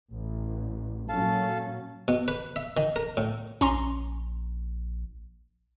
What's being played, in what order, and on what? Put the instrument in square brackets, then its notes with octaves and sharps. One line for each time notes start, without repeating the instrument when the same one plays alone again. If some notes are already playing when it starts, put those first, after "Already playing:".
[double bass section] A1
[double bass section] A#2 F#3 C#4 [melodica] A4 F5 A5
[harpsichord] B2
B4
E5
D#3
A#4
A2
[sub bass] A#1 [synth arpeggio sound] C#4 A#5 C6